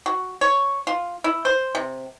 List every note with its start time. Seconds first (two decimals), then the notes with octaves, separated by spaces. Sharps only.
0.06 F#4
0.41 C#5
0.87 F4
1.24 E4
1.45 C5
1.75 C3